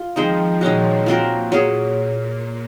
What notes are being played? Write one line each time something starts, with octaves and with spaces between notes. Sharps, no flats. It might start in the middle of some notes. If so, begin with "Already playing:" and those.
Already playing: F4
D#3 F3 G#3 C4 D#4
A#2 D#3 G#3 C#4 F#4
A#2 F3 C4 F#4 A#4
F#3 C#4 G#4